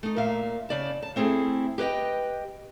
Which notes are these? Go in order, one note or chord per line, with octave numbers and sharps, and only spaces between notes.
A3 D#4
A#2 A#3 E5 F5
C#3 D5 A5
A5
A3 C4 E4 G#4 A4
G4 B4 C5 D#5 G5